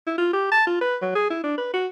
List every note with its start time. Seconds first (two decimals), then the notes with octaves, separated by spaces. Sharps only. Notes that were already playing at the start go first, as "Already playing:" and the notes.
0.07 E4
0.18 F4
0.33 G4
0.52 A5
0.67 F4
0.81 B4
1.02 F#3
1.15 G#4
1.30 E4
1.44 D4
1.57 B4
1.73 F#4